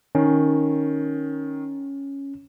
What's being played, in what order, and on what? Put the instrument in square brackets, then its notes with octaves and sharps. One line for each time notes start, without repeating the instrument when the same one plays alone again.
[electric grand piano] D#3 [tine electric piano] C#4